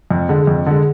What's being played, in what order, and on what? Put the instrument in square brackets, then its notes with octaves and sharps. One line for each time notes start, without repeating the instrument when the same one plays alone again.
[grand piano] F2
D3 G#3
F2
D3 G#3